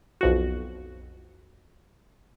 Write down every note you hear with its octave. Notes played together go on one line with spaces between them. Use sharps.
B1 F2 F#4